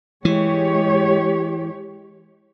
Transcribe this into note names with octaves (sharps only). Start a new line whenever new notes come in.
E3 G#3 G4 C#5